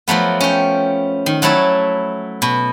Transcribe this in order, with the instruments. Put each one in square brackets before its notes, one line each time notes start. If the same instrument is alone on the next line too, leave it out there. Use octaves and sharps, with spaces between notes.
[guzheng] F3 F#3 A3 B3
C#4 G5
D#3
F#3 A3 E4 C#5 A5
B2